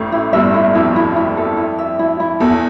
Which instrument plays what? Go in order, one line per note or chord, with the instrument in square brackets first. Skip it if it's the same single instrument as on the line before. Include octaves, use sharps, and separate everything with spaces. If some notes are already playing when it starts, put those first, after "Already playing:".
Already playing: [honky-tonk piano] A1 A2
[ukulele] E4
[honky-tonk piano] G1 G2 [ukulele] E5
[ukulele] E4
[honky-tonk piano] F2 [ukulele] E4
[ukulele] E4
E4
A4
E4
E5
E4
E4
[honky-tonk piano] E2 [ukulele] A4